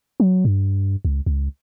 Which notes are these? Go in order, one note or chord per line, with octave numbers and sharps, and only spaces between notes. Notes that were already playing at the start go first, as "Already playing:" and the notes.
F#3
G2
C#2
C#2